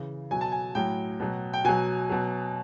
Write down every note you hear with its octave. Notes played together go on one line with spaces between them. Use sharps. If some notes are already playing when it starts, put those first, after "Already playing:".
Already playing: C#3 E3
B2 F#3 G#5
A5
G#5
A2 F#3 G5
B2 F#3
G5
B2 F#3 G#5
B2 F#3